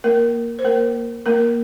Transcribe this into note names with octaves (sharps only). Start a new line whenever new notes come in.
A#3 A#4
C5
A#3 A#4
A#3 A#4